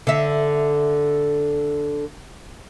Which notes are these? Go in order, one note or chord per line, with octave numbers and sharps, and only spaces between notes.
D3 E5